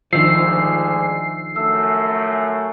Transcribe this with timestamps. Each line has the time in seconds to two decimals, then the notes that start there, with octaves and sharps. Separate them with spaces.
0.13 D2 G#2 D#3 F3 G#3 D4 E6 C7
1.56 F#2 A3 E6